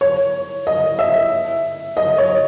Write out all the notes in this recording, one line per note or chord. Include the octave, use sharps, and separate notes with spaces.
C#5
D#5
E5
D#5
C#5